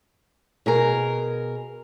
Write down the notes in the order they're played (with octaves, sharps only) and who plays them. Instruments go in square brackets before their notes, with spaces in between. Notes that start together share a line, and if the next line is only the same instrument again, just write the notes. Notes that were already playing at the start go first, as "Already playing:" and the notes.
[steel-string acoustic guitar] B2 G#4 A#4